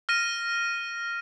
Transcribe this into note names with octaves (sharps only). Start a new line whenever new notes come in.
F6 A#6 D#7